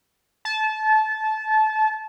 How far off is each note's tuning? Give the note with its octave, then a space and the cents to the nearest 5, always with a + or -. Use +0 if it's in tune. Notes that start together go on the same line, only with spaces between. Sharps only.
A5 -25